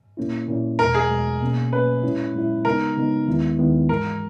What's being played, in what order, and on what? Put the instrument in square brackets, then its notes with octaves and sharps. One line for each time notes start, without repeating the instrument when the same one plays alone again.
[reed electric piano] A#2 A#3 C#4 E4
A#2 A#3 C#4 E4
[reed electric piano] E2 B2 G#3 [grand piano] A#4
[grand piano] G#4
[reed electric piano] E2 B2 G#3
B2 A#3 C#4
[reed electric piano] B2 A#3 C#4 [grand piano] B4
[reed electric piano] A#2 G#3 C#4 E4
A#2 G#3 C#4 E4
[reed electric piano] C#3 G#3 B3 D#4 [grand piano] A#4
[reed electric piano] C#3 G#3 B3 D#4
D#2 D#3 G#3 B3 E4
D#2 D#3 G#3 B3 E4
[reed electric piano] G#2 E3 G#3 [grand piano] A#4